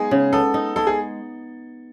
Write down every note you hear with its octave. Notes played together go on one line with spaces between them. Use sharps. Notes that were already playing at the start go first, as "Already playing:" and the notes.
Already playing: G#3 B3 D#4 G#4
C#3
B3 A4
D#4
G#3 A4
G#4